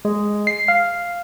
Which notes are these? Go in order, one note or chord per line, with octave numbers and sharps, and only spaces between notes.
G#3
C7
F5